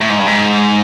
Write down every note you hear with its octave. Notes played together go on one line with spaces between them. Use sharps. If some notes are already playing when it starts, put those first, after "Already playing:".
A2
G#2
G2
G#2